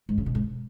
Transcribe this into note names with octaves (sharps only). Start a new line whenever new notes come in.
G#2
C#3
B2
G#2